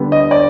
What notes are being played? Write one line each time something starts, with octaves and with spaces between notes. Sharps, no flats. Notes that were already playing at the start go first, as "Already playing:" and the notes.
Already playing: D3 G3 B3
D#5
D5